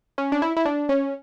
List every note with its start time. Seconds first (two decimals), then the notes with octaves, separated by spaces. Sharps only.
0.18 C#4
0.32 D4
0.42 E4
0.57 E4
0.65 D4
0.89 C#4